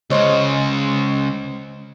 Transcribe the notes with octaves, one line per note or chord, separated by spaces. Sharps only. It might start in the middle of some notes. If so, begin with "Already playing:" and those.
C#2 C#3 C5 C#5 D#5